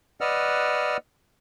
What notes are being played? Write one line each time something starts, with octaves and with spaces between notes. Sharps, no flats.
B4 D5 D#5 F#5 E6 F6